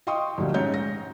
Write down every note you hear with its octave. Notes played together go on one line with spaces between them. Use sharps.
D#5 F5 G5 C6 C#6 D#6
D2 A#2 F3 G3
G#2 C#4 C#5 G6
A#6